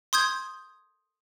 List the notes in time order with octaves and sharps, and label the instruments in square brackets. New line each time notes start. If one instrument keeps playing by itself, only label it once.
[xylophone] C6 D#6 G6 G#6